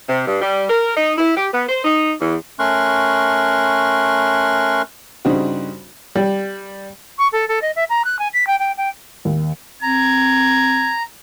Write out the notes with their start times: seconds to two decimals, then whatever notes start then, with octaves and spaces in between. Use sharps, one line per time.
0.09 C3
0.27 G2
0.42 G3
0.69 A#4
0.96 D#4
1.17 E4
1.37 G4
1.53 B3
1.69 C5
1.85 D#4
2.20 E2
2.59 A3 C#4 A#4 C6 C#6 F#6
5.25 G2 C#3 C4 D#4 F#4
6.16 G3
7.18 C#6
7.32 A4
7.48 A4
7.62 D#5
7.76 E5
7.89 A#5
8.05 F#6
8.19 G#5
8.33 B6
8.47 G5
8.59 G5
8.77 G5
9.25 D#2
9.83 C4 A#5 G#6